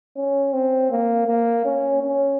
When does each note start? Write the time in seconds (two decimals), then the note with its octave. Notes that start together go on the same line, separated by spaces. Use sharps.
0.17 C#4
0.53 C4
0.91 A#3
1.27 A#3
1.65 C#4
2.03 C#4